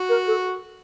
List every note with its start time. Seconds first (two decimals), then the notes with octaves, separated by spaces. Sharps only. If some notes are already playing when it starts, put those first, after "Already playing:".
Already playing: F#4
0.09 A#4
0.27 A4